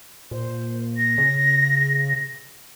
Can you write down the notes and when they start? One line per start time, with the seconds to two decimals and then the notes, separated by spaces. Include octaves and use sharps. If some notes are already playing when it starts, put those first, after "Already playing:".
0.31 A#2 C5
0.97 A#6
1.18 C#3